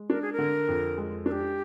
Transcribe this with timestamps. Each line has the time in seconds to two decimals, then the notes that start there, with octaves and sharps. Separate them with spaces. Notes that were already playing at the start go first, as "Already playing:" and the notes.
Already playing: G#3
0.10 D4 A#4
0.22 G#4
0.33 A#4
0.38 D3
0.68 F2
0.98 G#3
1.26 D4 A#4
1.31 G4